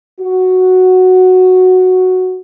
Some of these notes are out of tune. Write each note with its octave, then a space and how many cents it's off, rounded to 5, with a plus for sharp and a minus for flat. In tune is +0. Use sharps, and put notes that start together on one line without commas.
F#4 +0